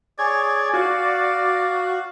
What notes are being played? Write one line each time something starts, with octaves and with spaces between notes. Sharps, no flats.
G#4 C#5 D5 G#6
F#4 F5